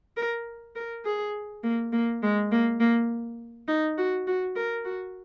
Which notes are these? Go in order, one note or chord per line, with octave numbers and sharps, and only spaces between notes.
A#4
A#4
G#4
A#3
A#3
G#3
A#3
A#3
D#4
F#4
F#4
A#4
F#4